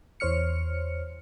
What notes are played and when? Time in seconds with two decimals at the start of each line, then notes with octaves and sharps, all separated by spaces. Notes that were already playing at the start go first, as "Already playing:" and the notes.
0.20 E2 C5 C#5 F6 C#7